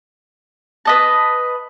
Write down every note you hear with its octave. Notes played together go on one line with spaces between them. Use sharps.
B4 D#5 A5